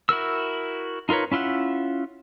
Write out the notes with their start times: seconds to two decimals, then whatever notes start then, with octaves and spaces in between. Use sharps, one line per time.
0.09 E4 F#4 A#4 E6
1.09 D#4 F4 A#4 B4 C#5
1.32 C#4 E4 F4 E5 F#5